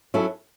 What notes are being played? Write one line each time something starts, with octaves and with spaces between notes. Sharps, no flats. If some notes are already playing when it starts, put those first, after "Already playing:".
F#3 C#4 E4 A4